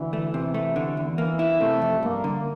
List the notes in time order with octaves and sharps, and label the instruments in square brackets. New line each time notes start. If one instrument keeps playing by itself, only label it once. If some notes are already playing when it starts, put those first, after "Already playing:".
Already playing: [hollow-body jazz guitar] D2 [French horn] E3
[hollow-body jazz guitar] A3
C3
A3
D3
E2
[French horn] E3 [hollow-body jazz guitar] A#3
[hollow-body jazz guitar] E4
[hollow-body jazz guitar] C3 [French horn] A3
[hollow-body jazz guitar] F2
[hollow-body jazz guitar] G2 [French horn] A#3
[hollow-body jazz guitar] D3